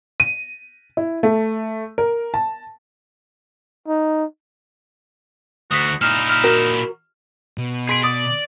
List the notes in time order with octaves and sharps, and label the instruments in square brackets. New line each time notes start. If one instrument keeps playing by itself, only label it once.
[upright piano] D#7
E4
A3
A#4
A5
[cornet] D#4
[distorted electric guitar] D2 [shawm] F#4 [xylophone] D#6 B6
[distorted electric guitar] A#2 E4 [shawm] D#4 [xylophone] F6 E7
[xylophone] F6
[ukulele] F#4 A#4
[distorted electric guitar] B2
[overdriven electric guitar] G#4 [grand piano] C6 B6 D7
[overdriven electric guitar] D5 [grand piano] D#6